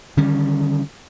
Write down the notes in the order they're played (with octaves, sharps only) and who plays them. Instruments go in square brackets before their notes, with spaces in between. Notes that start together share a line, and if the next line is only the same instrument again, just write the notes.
[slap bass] D3 D#3 G3 C#4